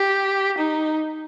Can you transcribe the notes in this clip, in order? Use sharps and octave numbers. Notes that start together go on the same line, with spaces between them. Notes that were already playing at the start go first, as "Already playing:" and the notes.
Already playing: G4
D#4